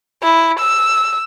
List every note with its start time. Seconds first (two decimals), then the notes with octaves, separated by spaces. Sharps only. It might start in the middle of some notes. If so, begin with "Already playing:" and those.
0.23 E4
0.60 E6